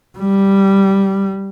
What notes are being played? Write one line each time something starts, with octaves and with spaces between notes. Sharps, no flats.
G3